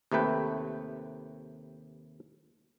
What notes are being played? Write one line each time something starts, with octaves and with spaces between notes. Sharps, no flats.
D#2 C3 A3 B4 G5